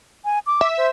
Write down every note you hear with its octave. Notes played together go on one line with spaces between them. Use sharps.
G#5
D6
E5
C5